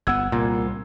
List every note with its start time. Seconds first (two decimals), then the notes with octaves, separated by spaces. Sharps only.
0.07 G1 B3 F#5 E6 G#6
0.32 C2 A#2